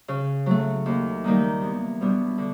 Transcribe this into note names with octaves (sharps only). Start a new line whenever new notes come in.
C#3
F#3 A3
D#2
D#3 G3 A#3 D#4
E2
B2 G3 B3 D4
D3